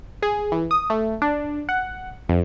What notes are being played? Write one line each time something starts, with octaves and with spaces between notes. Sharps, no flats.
G#4
E3
D#6
A3
D4
F#5
F2